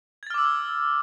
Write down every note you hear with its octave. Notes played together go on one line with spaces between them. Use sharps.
D6 E6 F6 G#6 A6